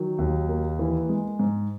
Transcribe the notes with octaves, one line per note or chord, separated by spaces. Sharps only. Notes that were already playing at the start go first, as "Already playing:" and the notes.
Already playing: D#3 F#3
D#2
A#3
E3
G#3
G#2